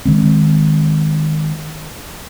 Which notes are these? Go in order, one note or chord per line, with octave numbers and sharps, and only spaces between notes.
D#3 G#3 C4